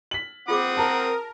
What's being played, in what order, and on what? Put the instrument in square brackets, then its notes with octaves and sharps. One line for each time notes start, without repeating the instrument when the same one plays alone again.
[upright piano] B6 F#7
[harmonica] C4 F#5 D#6 [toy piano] F4 G#4 D6
[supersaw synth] A#4 [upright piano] A5 A#5